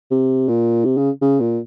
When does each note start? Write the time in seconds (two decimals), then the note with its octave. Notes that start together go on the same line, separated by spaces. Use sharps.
0.11 C3
0.48 A#2
0.85 C3
0.97 C#3
1.21 C#3
1.40 A#2